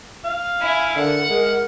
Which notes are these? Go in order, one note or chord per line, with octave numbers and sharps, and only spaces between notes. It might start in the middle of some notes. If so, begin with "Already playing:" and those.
F5
E4 G#5
D3 A#4 F#5
G#3 A#4